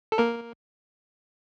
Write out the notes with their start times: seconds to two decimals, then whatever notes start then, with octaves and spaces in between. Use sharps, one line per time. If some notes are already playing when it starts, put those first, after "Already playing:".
0.12 A4
0.18 A#3 A#4